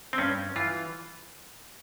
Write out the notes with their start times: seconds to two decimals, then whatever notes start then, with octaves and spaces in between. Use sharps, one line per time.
0.13 C4
0.18 G2 C#4
0.56 E3 F4